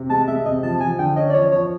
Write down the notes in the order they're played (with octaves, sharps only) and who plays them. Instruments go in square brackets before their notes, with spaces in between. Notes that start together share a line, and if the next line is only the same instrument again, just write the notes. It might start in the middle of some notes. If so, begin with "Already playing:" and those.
Already playing: [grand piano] C3
[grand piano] G#3 [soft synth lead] A5
[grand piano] G#3 [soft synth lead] E5
[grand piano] C3 [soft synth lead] D#5
[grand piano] F3 [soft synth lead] A5
[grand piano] F3 [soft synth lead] G#5
[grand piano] D3 [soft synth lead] G5
[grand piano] C#4 [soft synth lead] D#5
[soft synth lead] D5
[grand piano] F3 [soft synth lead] C#5
[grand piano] F3 [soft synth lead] C#5